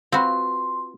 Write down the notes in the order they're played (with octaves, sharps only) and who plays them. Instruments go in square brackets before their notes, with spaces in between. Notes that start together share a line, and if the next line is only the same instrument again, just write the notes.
[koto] C4 F#4 [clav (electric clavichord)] F4 B4 [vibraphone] C6